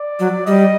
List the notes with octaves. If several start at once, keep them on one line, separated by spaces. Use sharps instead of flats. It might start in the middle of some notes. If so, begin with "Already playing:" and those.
Already playing: D5
F#3
G3 D#5